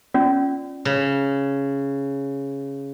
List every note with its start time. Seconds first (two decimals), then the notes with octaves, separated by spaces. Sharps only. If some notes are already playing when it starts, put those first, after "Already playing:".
0.14 C#4 F4 D5
0.85 C#3